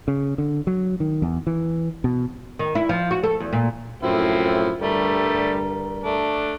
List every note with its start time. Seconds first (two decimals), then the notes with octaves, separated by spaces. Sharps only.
0.08 C#3
0.38 D3
0.67 F#3
1.00 D#3
1.22 E2
1.47 E3
2.04 B2
2.59 D#3
2.75 E4
2.89 F3
3.11 F#4
3.23 A4
3.40 E2
3.53 A#2
4.03 F#2 A2 F3 C4 E4
4.81 G2 D3 G3 A3 A#4
6.04 A3 D4